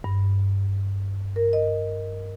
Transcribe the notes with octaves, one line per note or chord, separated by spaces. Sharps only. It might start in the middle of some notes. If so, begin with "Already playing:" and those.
G2
A#4
D#5